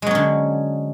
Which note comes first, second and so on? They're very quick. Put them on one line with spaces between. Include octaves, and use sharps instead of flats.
G#3 F#3 C#4 D3